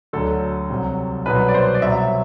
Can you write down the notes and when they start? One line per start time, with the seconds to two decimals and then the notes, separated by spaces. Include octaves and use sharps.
0.13 D2 D3 F#3 A4
0.69 C2 C3 F#3
1.26 C2 B2 F#3 B4
1.48 D5
1.54 C5
1.74 D5
1.82 C2 B2 F#3 E5